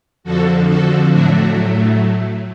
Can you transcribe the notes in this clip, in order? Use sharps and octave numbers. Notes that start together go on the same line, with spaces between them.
F2 D3 F3 F#4 A4
F#4 A4
A2 F#3 A3 D4 F#4